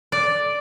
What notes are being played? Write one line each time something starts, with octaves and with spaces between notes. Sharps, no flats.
D5